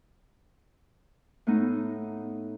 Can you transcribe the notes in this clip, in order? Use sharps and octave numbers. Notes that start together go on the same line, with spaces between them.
A2 A3 B3 D#4